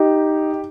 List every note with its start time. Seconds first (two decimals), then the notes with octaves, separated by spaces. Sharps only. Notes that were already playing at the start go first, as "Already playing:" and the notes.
Already playing: D#4 G4